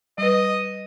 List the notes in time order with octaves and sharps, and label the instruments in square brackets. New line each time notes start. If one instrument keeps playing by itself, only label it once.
[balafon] G3 B4 [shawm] D#5